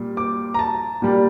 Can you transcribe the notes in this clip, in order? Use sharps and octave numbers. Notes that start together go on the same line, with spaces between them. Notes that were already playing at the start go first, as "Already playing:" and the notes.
Already playing: A#2 G3
D6
A#5
A5
A#2 G3